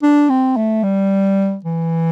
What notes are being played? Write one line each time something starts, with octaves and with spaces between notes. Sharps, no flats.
D4
C4
A3
G3
E3